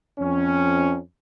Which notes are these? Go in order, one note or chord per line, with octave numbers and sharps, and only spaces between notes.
F2 C#4